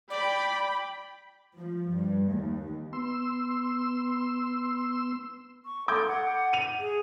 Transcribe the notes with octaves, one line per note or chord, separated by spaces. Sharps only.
D5 G5 B5
F3
G2
D#2
B3 C6 E6
C#6
A4 D6 G6 G#6
F#5
D#7 F7
G#4